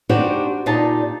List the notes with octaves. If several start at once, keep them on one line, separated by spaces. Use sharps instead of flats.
D4 D#4 F#4 G4 C5
A#2 D4 D#4 G4 A5